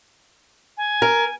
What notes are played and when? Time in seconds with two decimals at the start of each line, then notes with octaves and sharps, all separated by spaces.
0.77 G#5
1.02 A#4